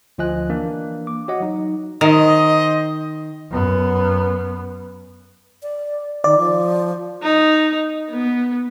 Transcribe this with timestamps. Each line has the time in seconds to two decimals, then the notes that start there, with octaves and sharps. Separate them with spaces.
0.18 D2 F3 F4 D#5 G#5 F#6
0.49 E3 A#3 D4
1.07 D6
1.28 F#4 C#5 D#5 F#5
1.40 F#3 D#4
2.01 D#3 C5 D#5
3.52 F#2 B3
5.63 D5
6.24 D#3 D5
6.38 F3
7.23 D#4
8.10 B3